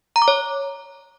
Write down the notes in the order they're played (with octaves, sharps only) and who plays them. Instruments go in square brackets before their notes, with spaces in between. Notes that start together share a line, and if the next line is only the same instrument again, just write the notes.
[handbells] A#5
D6
C#5